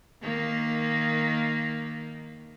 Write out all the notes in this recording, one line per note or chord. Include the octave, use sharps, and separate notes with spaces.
D#3 A#3